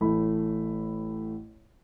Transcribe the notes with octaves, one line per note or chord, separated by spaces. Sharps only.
A1 A2 A3 B5